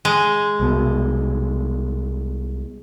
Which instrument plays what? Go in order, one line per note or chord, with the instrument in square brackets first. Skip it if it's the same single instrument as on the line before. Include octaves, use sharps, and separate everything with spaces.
[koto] G#3
[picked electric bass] C2 B2